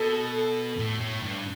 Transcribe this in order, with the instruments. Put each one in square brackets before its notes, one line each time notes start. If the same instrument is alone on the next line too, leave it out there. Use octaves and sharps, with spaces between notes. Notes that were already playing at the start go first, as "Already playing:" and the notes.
Already playing: [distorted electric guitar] B2 [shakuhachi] A4
[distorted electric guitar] A2
A2
G2